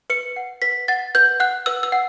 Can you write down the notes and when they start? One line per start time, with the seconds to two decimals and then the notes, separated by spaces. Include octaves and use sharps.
0.10 B4 C#7
0.36 F#5
0.62 B4 B6
0.88 F#5 A6
1.15 B4 G6
1.40 F#5 F#6
1.66 B4 E6
1.83 E6
1.92 F#5